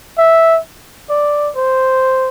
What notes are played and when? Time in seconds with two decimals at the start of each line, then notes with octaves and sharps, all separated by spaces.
0.18 E5
1.09 D5
1.56 C5